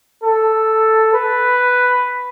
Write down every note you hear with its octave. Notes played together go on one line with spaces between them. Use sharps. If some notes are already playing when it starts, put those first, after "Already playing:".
A4
B4